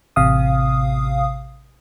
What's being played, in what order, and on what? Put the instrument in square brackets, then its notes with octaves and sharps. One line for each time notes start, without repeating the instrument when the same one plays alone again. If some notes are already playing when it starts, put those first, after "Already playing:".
[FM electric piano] A1 C3 F5 D#6